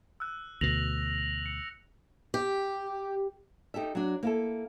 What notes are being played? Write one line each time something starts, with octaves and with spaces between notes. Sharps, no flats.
E6 F#6
D2 B2 A#6 F7 F#7
C#7
G4
D#4 G4 A4 E5
F#3 D4
A#3 E4 A4